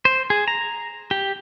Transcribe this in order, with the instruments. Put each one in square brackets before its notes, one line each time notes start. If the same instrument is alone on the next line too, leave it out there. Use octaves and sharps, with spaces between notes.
[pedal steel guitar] C5
G#4
A#5
G4